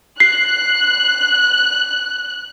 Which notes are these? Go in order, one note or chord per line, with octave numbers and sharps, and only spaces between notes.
F#6 C7